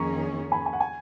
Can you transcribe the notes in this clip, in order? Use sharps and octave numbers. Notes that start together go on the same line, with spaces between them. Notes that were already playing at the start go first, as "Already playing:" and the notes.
Already playing: F2 D#3 A#3 C#4 G#4 A#5 C#6
G#5 B5
G#5
F#5
G#5